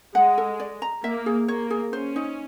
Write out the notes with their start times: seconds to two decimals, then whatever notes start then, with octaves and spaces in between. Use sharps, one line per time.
0.15 G#3 F#5
0.38 A4
0.60 D5
0.82 A#5
1.04 A#3 E5
1.26 G#4
1.48 A#3 C#5
1.70 G#4
1.93 C#4 C5
2.16 D#4